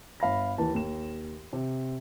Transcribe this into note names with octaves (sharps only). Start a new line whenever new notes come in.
G1 F5 B5 A#6
D#2 E3 B4 A5
D#2 E7
C3